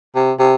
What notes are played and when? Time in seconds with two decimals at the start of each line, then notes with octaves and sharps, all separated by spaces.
0.15 C3
0.39 C3